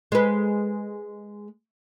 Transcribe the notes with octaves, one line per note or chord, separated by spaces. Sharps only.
G#3 B4